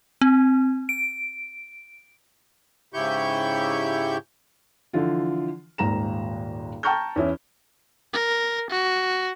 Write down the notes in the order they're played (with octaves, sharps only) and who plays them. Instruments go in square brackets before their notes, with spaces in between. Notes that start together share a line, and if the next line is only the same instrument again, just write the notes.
[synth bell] C4
D7
[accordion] G#2 C#3 E4 G4 C#6 G6
[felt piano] D3 E3 F3 F4
D#1 G#1 A#5 E7
G5 A5 A#5 C#6 F6 G6
E2 C#4 E4
[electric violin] A#4
F#4